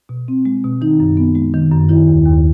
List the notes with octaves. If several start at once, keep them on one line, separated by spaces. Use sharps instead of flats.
B2
C4
G#3
B2
D#3 D#4
F#2
B3
G#3
D#3
F#2
D#3 E4
D#2
D#2